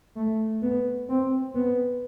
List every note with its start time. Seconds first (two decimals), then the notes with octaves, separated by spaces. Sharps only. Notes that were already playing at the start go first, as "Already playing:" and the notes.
0.17 A3
0.62 B3
1.09 C4
1.55 B3